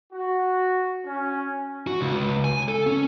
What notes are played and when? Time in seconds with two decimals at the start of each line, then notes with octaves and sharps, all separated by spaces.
0.13 F#4
1.05 C#4
1.87 F#4
2.01 C#2
2.45 G#5
2.68 A4
2.87 C#4